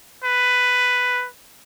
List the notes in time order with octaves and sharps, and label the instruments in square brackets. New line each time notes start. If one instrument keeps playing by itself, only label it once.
[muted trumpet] B4